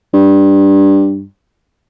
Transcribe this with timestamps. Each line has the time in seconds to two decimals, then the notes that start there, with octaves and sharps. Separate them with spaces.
0.13 G2